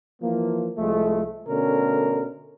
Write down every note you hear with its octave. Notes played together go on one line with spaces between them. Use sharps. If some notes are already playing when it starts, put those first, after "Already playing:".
E3 F3 A#3
C2 F3 G#3 A3
B2 D3 A3 C#4 A#4